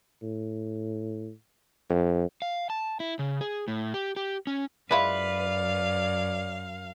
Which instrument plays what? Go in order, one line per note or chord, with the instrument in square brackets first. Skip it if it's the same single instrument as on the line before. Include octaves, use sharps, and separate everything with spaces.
[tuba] A2
F2
[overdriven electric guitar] F5
A5
E4
C#3
G#4
A2
G4
G4
C#4
[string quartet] F#2 F5 [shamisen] G#3 E4 F4 [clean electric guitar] B4 [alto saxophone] D5